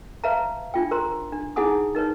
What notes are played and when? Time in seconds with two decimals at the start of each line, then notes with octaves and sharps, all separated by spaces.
0.24 B4 C#5 E5 F5 A5 A#5
0.74 D4 F4 G5
0.91 A#4 C5 A#5 C6
1.32 D4
1.56 D#4 E4 G#4 F#5 G#5 D#6
1.95 D#4 A#4 B4 C#5